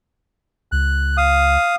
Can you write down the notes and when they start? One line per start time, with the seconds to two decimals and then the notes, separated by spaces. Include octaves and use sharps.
0.72 C#2 F#6
1.17 F5 D#6